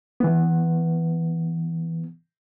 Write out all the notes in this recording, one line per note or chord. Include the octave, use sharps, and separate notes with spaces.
E3 B3